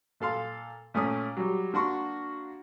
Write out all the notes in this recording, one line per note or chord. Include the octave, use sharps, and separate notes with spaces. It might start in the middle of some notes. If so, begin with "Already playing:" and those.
A#2 A4 F5 C6
A#2 A3 C#4 D#6
F#3 G3
A#3 D4 F#4 C6 C#6